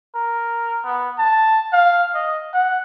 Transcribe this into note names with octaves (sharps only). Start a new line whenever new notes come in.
A#4
B3
A5
F5
D#5
F#5